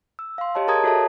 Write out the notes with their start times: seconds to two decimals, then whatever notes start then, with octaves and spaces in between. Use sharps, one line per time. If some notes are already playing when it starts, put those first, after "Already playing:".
0.19 E6
0.38 F5 C6
0.55 G4 C#5 D#5 A5
0.68 G#4 A#4 A5 A#5 D#6 G#6
0.84 F#4 A4 C#5 E5 A5